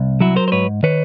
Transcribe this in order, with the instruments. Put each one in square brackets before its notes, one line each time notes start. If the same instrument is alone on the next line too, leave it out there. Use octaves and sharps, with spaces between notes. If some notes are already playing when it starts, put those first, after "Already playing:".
Already playing: [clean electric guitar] C2
F#3 E4 F#4
A#4 C5
C5
G#2 B4 C#5
D#3 B4 C#5